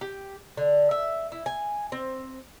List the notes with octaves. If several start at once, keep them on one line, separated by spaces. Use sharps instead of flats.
G4
D3
E5
E4
G#5
C4